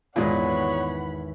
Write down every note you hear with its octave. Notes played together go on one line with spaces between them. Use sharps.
G#1 E2 A#2 G#3 B3 C#5 F#5 B5